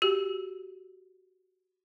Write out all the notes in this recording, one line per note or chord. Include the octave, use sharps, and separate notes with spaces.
F#4 G4